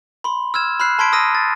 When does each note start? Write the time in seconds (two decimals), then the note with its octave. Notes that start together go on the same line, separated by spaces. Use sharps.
0.24 B5 C6
0.54 E6 F6 G#6 E7
0.80 B5 F6 F#6 C7
0.99 A5 B5 C6 G#6 B6 D7
1.12 D#6 E6 A#6 D#7
1.35 A6